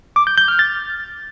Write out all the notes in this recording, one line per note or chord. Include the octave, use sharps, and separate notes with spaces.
D6
G6
G6
F6
A6